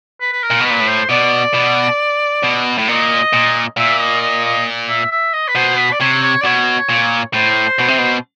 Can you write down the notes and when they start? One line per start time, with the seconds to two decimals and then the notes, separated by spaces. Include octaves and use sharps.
0.20 B4
0.32 B4
0.43 A#4
0.51 A#2
0.60 B2
0.65 B4
0.70 A#2
0.80 A2
0.87 C5
1.10 B2 D5
1.54 B2
2.44 B2
2.78 A2
2.88 A#2 D#5
3.33 A#2
3.77 A#2 E5
4.00 D#5
4.22 D#5
4.44 D#5
4.89 E5
5.11 E5
5.33 D#5
5.48 B4
5.55 B2 C5
5.78 B4
5.92 D5
6.00 C3 C#5
6.23 C#5
6.41 D5
6.45 B2 C#5
6.90 A#2
7.34 A2 C5
7.79 B2
7.88 C3
7.98 B2